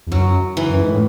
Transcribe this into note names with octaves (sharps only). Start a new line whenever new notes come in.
E2
F#2 F#3
E3
F#2
G#2
A2